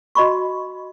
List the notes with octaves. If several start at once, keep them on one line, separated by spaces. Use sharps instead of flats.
F#4 D#5 B5 C#6